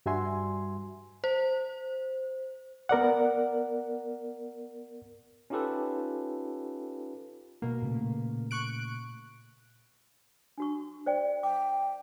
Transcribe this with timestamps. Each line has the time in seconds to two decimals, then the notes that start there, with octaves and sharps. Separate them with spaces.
0.06 G2 G3 F#4 E5 G#5 C6
1.24 C5
2.89 B3 A#4 D5 F#5
5.50 C#4 D#4 F4 G4 A4 B4
7.62 B2 A#3
7.82 A#2 C#3 A3
8.51 C#6 F#6 D7
10.58 D4 F#4 C#6
11.06 C5 D5 G5
11.43 G5 D6